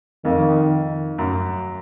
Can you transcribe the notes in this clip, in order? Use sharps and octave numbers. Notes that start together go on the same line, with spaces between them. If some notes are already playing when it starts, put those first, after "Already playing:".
F2 D#3
F#2